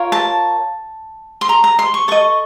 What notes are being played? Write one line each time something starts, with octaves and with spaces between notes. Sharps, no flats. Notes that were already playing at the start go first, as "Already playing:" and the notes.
Already playing: F4 A#4 C#5
A5
C6
A#5
A#5
C6
C#6
A4 D#5 C#6